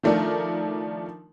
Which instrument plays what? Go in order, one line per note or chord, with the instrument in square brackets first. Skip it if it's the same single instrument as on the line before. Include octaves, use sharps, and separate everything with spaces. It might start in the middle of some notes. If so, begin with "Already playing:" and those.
[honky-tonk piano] D#3 F3 A3 D4 A#4